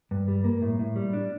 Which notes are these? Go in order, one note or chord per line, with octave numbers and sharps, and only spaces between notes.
G2
G3
A#3
A2
A2
G3
D4